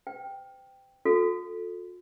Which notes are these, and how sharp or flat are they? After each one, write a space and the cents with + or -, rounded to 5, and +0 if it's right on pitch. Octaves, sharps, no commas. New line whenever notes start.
C5 -40 G5 +0
F4 +45 A4 +0